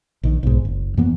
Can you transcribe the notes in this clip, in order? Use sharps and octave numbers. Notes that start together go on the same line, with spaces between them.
A#1 D#3
B1 G#2
F#1
F#2 E3 A#3 B3